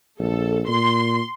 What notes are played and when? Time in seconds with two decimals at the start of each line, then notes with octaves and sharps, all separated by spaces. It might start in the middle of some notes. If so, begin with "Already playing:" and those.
0.19 A#1 A4
0.68 A#2 C6